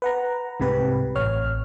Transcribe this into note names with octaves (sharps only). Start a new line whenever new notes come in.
B4 F#5 A#5
C2 G#2 C3 G4 B4
A1 C#5 F6